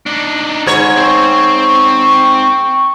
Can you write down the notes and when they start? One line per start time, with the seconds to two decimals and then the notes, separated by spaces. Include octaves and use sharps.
0.06 D4 D#4
0.66 G#2 C#5
0.97 C4 C5 C#6